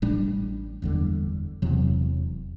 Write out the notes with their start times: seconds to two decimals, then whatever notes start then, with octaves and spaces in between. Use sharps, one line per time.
0.02 A1 A2 G3 D4
0.82 F#1 E2 D3 G3
1.62 E1 E2 C3 F#3